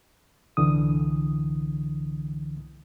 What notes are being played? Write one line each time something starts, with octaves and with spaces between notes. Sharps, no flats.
C2 D3 E3 D#6